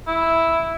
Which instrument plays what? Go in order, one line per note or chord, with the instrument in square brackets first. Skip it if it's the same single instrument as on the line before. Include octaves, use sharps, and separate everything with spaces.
[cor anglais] E4